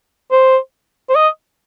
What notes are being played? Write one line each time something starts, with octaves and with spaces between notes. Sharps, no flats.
C5
C5
D#5